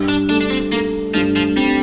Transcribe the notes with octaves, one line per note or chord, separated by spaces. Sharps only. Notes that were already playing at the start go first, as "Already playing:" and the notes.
Already playing: G2
D4
A3 D4
D4
C4
A3 A#3
G2 F3
F3
G3 C4